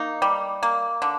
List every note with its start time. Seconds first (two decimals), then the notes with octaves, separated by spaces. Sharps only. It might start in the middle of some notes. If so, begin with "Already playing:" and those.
Already playing: A#3 D#4
0.22 G3
0.63 A#3
1.02 D3